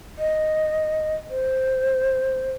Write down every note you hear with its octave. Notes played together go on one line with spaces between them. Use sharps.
D#5
C5